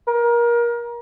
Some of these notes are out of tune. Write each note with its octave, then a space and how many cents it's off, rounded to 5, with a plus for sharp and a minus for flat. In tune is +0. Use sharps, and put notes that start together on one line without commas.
A#4 +25